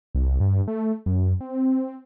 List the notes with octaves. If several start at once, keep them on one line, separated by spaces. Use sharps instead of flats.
C2
G2
A3
F#2
C4